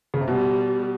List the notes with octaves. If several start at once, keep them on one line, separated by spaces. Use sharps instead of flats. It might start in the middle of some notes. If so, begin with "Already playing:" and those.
C#3
C3
B2 G3